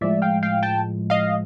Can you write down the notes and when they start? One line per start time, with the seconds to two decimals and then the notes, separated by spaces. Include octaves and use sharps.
0.01 A2 F3 G#3 D5 E5
0.22 F5 G5
0.43 F5 G5
0.63 G5 A5
1.10 D#5 F5